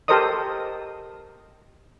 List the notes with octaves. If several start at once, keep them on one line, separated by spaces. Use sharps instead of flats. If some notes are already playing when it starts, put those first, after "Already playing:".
G4 A4 A#4 C5 D#5 D#6